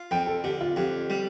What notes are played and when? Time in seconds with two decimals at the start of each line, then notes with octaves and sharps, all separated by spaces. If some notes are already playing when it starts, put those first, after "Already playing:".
Already playing: F4
0.11 F2 G5
0.27 A4
0.44 D3 G4
0.61 F4
0.76 F2 G4
1.10 G3